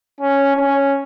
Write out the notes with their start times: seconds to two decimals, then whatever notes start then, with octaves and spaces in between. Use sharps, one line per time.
0.20 C#4
0.56 C#4